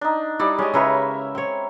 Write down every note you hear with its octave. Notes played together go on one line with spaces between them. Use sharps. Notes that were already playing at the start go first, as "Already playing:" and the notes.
D4 D#4
G3 D#4 E4 D5
G#3 C#4 G4 D#5
C#3 E4 A#4 B4 C#5 E5
C4 C#5